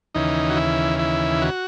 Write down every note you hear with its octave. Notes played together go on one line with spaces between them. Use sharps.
D#2 C#3 E3 D#4
F#4
E4
E4
F#4